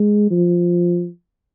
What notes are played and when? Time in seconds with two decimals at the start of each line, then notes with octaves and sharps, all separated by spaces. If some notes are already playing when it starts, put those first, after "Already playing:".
Already playing: G#3
0.31 F3